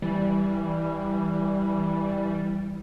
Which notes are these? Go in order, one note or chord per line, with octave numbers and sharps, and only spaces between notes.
E3 G3